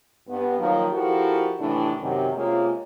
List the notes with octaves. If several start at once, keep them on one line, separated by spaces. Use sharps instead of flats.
G2 B3
D#3 F3 F#3 A#3
F3 E4 F#4 G4 A4 A#4
D#2 A2 C3 E3 D4
F#2 C3 D#3
C3 G#3 A#3 C#4 F4